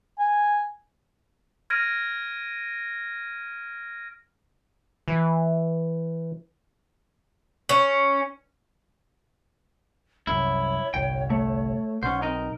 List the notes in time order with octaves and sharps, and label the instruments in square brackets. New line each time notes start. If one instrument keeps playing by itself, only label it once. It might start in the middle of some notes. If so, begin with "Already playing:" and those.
[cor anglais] G#5
[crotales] F6 G#6 A#6 D7 D#7
[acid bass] E3
[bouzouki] C#4
[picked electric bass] C2 F#2 [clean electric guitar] E4 [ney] C#5
[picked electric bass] G1 C2 [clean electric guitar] G5
[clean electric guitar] A3
[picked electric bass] B1 [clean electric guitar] C#4 C5 [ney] F#5
[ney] C4 [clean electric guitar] D#4 A#4 D#5